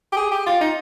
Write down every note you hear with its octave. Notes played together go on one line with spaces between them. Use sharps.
G4
G#4
G4
F4
D#4